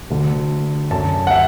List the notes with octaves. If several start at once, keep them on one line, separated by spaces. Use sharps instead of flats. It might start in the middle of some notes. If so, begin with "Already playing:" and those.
D2 D3
F#2 D3 A5
F#5
E5